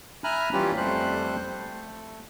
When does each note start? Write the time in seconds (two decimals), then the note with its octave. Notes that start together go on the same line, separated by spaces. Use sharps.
0.24 E5 G#5 A#5 B5 F6 F#6
0.53 E3 G3 C#4 F4 G4 B4
0.77 F2 G3 A3 C5 F#6
1.48 A3